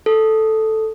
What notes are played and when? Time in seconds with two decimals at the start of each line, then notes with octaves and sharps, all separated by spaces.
0.06 A4